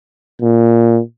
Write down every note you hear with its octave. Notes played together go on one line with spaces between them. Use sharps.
A#2